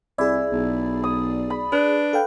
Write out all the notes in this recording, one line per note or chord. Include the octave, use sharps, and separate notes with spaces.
C2 E4 G#4 D5
B1
D#6
B5
D4 B4
A4 F5 G5